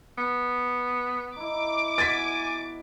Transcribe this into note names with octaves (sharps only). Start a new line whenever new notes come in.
B3
D#4 E4 D6
B2 E4 F#4 G#5 A6 B6